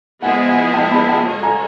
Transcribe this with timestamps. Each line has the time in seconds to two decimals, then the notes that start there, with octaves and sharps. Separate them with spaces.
0.22 F3 G#3 B3 E4 G#4 F#5 G#5
0.49 F#5 G#5
0.74 G5 A5
0.92 A5 B5
1.09 G5 A5
1.27 G#3 C#4 F#4 A4 C#5
1.43 G#5 A#5